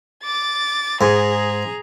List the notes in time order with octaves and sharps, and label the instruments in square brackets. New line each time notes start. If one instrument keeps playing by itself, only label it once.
[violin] D6 A6
[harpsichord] G#2 [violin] G#4 A#5